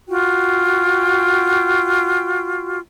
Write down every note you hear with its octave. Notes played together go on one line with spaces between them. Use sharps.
F4 F#4 G5